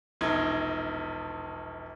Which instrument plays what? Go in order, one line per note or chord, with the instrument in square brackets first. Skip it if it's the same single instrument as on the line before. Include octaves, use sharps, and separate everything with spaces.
[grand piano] E1 A#1 D#4 G#6